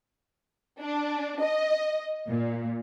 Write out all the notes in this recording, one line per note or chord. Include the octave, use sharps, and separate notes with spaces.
D4
D#5
A#2